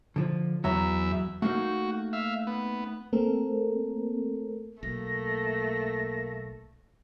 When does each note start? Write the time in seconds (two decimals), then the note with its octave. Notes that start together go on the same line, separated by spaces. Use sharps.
0.16 D3 F3
0.64 E2 F#3 F#4 E5 A#5
1.42 A3 A#3 D#4 F#4
2.13 E5 F5
2.47 B3
3.13 A3 A#3 C4 A4 A#4
4.83 B1 A3 A#3 A#6